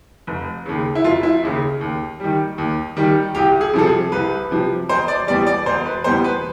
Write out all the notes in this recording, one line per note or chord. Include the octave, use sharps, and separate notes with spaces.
F1
D#2 C#3
E4
F1 F4
E4
D#2 C#3
D#2
D#3 G3
D#2
D#3 G3
C2 G4
G#4
C3 F3 A4
G#4
C2 B4
C3 F3
E1 C5
D5
E2 B2 G3 D5
D5
E1 C5
B4
E2 B2 G3 C5
B4